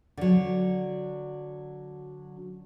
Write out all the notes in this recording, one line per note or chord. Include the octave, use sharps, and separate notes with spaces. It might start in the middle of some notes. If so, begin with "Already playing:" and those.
D3 F#3